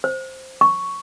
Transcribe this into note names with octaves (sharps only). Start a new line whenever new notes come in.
C5
C#6